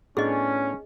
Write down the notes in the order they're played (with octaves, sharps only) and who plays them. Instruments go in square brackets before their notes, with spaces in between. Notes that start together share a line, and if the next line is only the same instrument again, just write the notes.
[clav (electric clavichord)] A2 B3 D4 [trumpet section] C#4 [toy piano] G#4 D#5